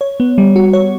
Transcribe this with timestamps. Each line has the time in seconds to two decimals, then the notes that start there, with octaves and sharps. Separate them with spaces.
0.01 C#5
0.20 B3
0.38 G3
0.56 F#4
0.73 C#5